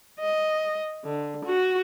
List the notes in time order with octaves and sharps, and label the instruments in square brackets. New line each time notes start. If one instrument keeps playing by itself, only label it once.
[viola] D#5
D3
F#4